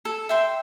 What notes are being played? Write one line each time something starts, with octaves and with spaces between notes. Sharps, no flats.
A4
E5 G5 C6